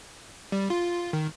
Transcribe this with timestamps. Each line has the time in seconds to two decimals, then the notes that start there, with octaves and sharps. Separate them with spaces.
0.52 G3
0.70 F4
1.13 D#3